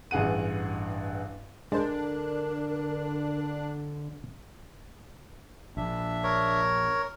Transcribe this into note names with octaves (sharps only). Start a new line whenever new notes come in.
A1 G2 G#4 F#5 D#7
D3 G#3 D4 A#4 C5
A#1 D4 E5
A#4 C#5